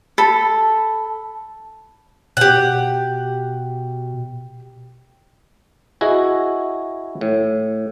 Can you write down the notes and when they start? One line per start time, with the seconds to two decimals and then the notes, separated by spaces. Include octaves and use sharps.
0.18 A4 B5
2.37 B2 G4 F#5
6.01 E4 F#4 G#4 D#5
7.21 A2